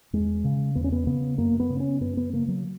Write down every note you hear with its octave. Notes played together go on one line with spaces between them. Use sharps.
E2 G#3
C#3
E2 B3
C#4
B3
C#3 B3
F#2 A#3
B3
C#3
C#4
F#2 B3
B3
C#3 A#3
F#3